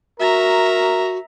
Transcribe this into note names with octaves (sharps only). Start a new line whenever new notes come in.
F#4 A#4 E5 A#5